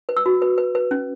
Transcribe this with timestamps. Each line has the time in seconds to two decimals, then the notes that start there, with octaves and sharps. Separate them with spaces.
0.09 B4
0.17 E6
0.26 F#4
0.42 B4
0.58 B4
0.75 B4
0.91 C#4